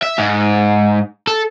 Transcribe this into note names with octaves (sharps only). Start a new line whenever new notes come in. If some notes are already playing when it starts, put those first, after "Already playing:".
E5
G#2
A4